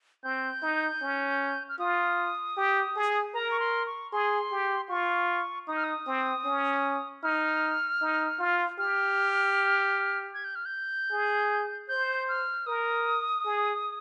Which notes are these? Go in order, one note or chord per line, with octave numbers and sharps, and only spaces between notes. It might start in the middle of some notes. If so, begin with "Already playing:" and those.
C4 G6
D#4
C#4
F6
F4 D#6
G4
G#4
A#4 A#5
C#6
C6
C#6
G#4 C6
G4
F4 C#6
D#4 D#6
F6
D#6
C4
C#4
D#4 F6
D#4
F4
G4 F6
G#6
G6
F6
G6
G#4
C5 G6
F6
A#4 D#6
G#4